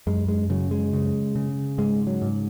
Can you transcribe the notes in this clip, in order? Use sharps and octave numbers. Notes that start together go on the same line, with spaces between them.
F#2 G#3
G#3
C#3 F#3
G#3
C#3
C#3
G#2 G#3
F#3
G#2